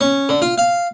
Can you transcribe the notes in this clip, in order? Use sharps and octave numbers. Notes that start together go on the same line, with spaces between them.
C#4
D3
F4
F5